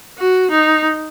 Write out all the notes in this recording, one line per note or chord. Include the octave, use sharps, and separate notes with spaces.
F#4
D#4